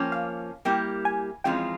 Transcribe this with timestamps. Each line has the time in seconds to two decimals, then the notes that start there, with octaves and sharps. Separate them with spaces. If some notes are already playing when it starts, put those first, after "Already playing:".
Already playing: F3 A#3 C#4 G5
0.12 F5
0.65 G3 A#3 E4 G4 G5
1.05 G#5
1.44 F2 E3 G#3 C#4 F4 G5